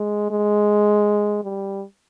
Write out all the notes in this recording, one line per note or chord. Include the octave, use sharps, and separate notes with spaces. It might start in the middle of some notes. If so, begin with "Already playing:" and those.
Already playing: G#3
G#3
G3